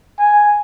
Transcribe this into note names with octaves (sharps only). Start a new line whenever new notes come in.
G#5